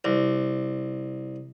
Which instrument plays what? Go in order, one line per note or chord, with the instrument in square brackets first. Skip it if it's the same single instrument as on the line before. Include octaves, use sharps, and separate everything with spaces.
[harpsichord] C2